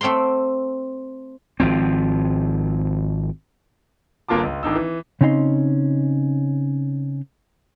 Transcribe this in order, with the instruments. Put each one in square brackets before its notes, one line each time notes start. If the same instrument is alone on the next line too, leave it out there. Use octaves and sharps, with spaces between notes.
[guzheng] A3 C4 D5 F5 C6
[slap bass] G#1 F3 C4
[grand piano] G1 A#3 F4 A5 D6
C#2
G#1 D4 D#4 E6
E3
[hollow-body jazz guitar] C#3 C4 C#4 D#4 F5 C6